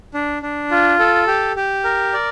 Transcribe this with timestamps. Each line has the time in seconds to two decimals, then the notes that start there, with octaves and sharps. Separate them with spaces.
0.14 D4
0.42 D4
0.71 F4
0.99 A4
1.27 G4
1.56 G4
1.84 A#4
2.13 D5